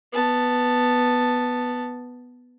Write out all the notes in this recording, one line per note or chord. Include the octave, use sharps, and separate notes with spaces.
B3 A5